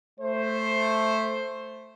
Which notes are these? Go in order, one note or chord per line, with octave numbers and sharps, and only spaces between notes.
A3 C5